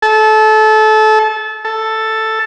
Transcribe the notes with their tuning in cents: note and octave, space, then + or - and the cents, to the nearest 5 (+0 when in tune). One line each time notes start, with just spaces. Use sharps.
A4 -25
A4 +5